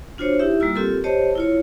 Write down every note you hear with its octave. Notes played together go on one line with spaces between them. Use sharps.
D4 F4 F#4 C5 C#5
D#4 E4 G4 E5
G3 A#3 F4 E6
C4 F4 G4 A4 A#4
G4 C5 C#5 D#5 A5
E4 F4 C#5